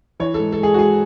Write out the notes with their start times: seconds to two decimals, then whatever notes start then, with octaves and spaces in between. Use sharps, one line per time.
0.20 E3 C#5
0.34 A4
0.39 G#2
0.52 A4
0.59 G#3 G#4
0.74 F#4
0.78 G#2 G#4